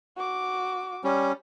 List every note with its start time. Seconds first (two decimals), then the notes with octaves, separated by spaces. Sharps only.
0.16 F#4 D6
1.04 G3 C#4